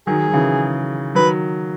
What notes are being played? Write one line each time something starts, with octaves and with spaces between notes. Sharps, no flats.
D#3 F#3 G#4
F#3
C#3 E3
D#3 F#3 B4